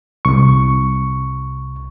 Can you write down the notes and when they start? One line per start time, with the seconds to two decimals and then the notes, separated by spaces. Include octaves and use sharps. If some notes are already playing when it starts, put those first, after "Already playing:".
0.25 C2 C#6